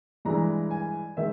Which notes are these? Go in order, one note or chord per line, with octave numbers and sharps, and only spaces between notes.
G2 E3 G#3 A#5
G#5
D#3 G#3 E5